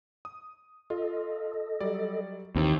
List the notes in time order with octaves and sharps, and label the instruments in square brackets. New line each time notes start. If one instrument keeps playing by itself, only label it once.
[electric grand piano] D#6
[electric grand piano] F4 [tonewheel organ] A4 D#5
[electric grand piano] F#3 G3 D5
[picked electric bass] D#2 [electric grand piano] E3 A#3 C4